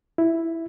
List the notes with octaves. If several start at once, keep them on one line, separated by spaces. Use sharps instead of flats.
E4